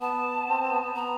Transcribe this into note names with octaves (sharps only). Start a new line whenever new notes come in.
B3 A5
C4
C4
B3
B3
A#5